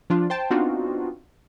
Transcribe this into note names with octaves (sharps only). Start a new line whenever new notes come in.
F3 D4 F4
C5 G5 A5
B3 C4 D4 D#4 F4 F#4